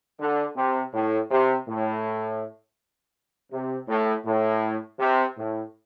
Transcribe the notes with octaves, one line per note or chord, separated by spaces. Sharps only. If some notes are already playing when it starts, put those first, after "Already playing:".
D3
C3
A2
C3
A2
C3
A2
A2
C3
A2